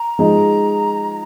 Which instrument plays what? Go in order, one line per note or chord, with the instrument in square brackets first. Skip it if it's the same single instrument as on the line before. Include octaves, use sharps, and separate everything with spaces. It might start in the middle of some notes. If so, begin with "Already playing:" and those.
Already playing: [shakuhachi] A#5
[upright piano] F3 G#3 D#4